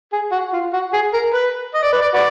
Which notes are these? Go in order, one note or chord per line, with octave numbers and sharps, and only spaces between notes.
G#4
F#4
F4
F#4
G#4
A#4
B4
D#5
D5
B4
D5
F#4 B4 D5